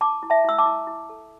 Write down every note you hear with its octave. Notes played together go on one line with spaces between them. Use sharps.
E4 A5 D6
E4
E5 A5
E4 E6
A5 D6
E4
E4
A4